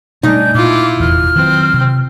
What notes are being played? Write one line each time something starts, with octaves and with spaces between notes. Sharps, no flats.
B2 G3 A3 D4 D#4 D#5 G#5 G6
A#2 E4 F4 D6
F1 E2 F6
D#3 F#3 C4
C3